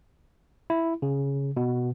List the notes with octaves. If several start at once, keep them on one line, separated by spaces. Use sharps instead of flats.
E4
C#3
B2